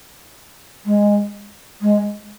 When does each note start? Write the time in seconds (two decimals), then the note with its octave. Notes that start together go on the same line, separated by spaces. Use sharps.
0.85 G#3
1.81 G#3